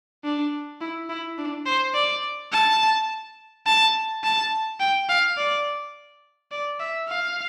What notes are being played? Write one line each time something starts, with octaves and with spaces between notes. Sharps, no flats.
D4
E4
E4
D4
C5
D5
A5
A5
A5
G5
F5
D5
D5
E5
F5